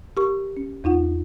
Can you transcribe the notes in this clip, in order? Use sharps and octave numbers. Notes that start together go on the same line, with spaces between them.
G4 A#4 C#6
C#4
E2 D#4 F4 F#5